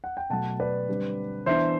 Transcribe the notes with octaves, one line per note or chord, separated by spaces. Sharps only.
F#5
G5
B2 F#3 A3 F#5 A5
B4 D5
D3 G3 C4
E3 B3 D4 C5 E5